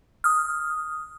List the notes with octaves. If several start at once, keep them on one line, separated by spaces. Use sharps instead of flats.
D#6 F6